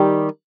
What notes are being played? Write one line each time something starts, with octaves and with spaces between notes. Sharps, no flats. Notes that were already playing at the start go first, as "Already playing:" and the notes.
Already playing: D#3 G3 G4